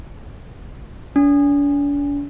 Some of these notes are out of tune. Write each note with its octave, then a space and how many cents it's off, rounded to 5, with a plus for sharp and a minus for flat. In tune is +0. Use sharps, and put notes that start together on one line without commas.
D4 -45